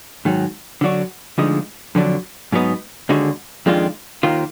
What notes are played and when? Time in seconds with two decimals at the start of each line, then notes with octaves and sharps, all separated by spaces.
0.25 G#2 D#3 F#3
0.81 D3 F#3 D4 F#4
1.38 D2 D3 F3 G#3 D#4
1.95 F2 D3 F#3 D4
2.52 G#2 F#3 B3 D#4
3.09 D#2 D3 G#3 D#4 F#4
3.66 F2 D#3 G#3 D4 F4
4.23 D#2 D#3 A#3 F4